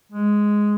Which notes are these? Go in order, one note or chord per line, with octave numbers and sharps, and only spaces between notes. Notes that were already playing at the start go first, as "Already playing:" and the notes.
G#3